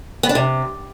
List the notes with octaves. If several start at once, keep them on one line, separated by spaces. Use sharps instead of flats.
B3
D4
C3